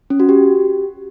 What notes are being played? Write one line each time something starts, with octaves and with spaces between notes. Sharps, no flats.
C#4
F#4
G4